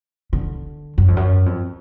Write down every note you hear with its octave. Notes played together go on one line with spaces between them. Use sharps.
D3
F#2
F2
F#2
F2